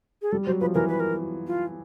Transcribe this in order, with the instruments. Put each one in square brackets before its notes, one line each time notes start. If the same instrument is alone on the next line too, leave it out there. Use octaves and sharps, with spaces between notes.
[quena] G#4
[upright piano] G3 [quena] A4
[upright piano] F#3 [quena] C5
[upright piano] F3 [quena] B4
[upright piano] E3 [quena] A#4
[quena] B4
A#4
F4